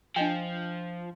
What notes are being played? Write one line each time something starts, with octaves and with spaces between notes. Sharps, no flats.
F3 D4 D#5 G5